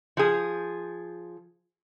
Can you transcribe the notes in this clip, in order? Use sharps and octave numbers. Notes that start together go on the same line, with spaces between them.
F3 G#4